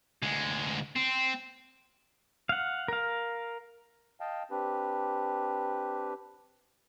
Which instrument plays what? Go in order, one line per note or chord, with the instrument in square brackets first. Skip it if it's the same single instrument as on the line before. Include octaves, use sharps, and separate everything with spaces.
[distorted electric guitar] D2 G#3
C4
[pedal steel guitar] F5 F#5
A#4 F5
[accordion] D#5 F5 G5 A5
C4 D4 G4 B4